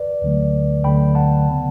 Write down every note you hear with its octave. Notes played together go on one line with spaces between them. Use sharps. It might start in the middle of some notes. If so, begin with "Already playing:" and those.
Already playing: B4 D5
D2 D3 F#3 A3
D2 D3 F#3 A3 G5 B5
F#5 A5
C#3 F#3 B3